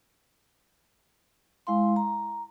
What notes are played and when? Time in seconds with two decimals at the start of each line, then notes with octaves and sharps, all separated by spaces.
1.67 G#3 E4 F5 C6
1.96 A#5